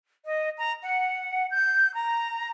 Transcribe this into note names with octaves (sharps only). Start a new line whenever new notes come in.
D#5
A#5
F#5
G6
A#5